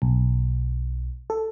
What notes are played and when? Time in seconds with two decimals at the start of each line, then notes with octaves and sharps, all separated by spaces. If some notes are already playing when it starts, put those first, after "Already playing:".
0.02 B1
1.30 A4